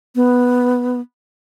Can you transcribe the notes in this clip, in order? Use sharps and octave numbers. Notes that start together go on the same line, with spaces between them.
B3